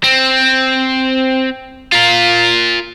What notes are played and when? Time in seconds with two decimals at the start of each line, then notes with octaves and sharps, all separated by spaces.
0.04 C4
1.93 F4 A#4